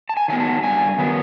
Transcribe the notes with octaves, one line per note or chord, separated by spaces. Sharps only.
A5
G#5
D#3 F#3 B3 G#5
A5
G2 G#5
D#3 F#3 B3